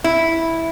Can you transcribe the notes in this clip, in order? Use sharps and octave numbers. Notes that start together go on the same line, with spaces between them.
E4